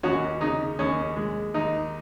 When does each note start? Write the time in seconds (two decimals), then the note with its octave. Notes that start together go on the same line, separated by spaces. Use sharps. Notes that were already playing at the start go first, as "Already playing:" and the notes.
0.03 D#2 C#4 F#4
0.41 C#3 D#4
0.79 D#2 C#4
1.16 G#3
1.54 D#2 D#4